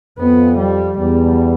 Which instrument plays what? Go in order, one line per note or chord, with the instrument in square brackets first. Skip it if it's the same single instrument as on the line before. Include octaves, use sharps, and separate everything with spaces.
[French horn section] F2 [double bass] B3
[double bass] G3
[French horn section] E2 [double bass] G3